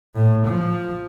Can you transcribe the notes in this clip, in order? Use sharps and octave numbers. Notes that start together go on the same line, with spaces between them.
A2
F3